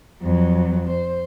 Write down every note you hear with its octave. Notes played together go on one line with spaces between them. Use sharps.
F2 F#3
C5